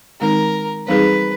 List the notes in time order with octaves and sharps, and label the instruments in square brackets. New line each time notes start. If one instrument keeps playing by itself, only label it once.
[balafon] D#3 G#3 C4 D#4 [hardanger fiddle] A#4
[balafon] E3 G3 C4 D#4 G#4 [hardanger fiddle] B4